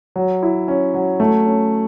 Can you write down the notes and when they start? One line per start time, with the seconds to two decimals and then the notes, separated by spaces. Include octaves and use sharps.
0.16 F#3
0.43 E4
0.68 C#4
0.94 F#3
1.20 A3
1.46 C#4